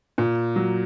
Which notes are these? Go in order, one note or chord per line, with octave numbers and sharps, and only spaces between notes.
A#2
F#3